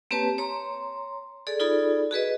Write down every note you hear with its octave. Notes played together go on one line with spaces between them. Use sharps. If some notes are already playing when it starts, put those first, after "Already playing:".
A#3 C4 G4 B4 C#5 A5
C#5 A#5 C6
G#4 A4 D5
D#4 F4 G#4 A4 D5 B5
F#4 G#4 B4 D#5